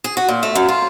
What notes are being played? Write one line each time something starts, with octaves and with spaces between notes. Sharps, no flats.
G#4
F#4
A#2
A3
F#2
F4